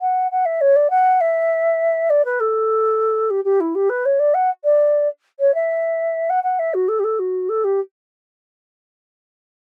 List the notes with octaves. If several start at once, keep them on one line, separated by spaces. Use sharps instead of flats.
F#5
F#5
E5
C#5
D5
F#5
E5
D5
B4
A4
G4
G4
E4
G4
B4
C#5
D5
F#5
D5
C#5
E5
F#5
F#5
E5
F#4
A4
G4
A4
F#4
A4
G4